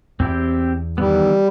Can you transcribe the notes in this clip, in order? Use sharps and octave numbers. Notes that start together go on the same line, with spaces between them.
E2 C4 E4 G4
D#3 E3 G3 B3